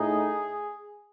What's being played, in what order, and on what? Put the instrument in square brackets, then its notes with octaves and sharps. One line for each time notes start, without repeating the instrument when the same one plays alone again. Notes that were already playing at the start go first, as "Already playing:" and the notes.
Already playing: [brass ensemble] A2 D#4 G#4